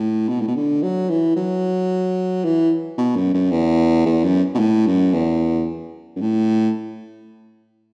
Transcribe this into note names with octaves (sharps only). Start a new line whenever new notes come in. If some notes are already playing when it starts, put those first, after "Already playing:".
Already playing: A2
B2
A2
B2
D3
F#3
E3
F#3
E3
B2
F#2
F#2
E2
E2
F#2
B2
A2
F#2
E2
F#2
A2